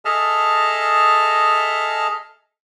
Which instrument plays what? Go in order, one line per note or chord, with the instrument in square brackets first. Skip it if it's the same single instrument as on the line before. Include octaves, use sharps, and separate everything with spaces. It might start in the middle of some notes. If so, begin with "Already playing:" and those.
[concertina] G#4 A4 D#5 E5 A5 F6